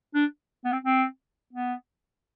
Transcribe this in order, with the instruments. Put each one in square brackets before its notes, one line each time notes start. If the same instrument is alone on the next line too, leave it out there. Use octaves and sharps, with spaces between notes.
[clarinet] D4
B3
C4
C4
B3